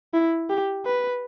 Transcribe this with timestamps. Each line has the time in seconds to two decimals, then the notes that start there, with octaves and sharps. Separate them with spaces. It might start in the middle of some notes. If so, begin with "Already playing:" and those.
0.14 E4
0.50 G4
0.86 B4